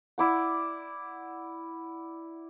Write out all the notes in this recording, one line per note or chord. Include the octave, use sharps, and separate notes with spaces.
E4 D5 F#5